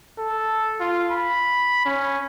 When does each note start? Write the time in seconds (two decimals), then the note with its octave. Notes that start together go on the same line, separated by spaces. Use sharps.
0.18 A4
0.80 F4
1.12 B5
1.85 C#4